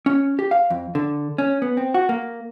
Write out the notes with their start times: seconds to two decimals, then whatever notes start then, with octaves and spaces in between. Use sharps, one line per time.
0.06 C#4
0.39 G4
0.51 F5
0.70 F2
0.95 D3
1.38 C#4
1.62 B3
1.77 C4
1.94 F#4
2.09 A#3